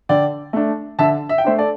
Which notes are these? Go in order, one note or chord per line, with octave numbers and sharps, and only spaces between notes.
D3 D5 G5
A3 D4
D3 E5 A5
E5
G5
A3 D4 C5 E5
A4 D5